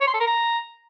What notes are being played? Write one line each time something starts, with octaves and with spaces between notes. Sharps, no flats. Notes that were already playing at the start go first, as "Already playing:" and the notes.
C#5
C6
A4
A#4
A#5